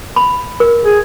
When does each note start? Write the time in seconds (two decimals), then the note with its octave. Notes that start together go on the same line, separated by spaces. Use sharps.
0.16 B5
0.60 A#4
0.84 G#4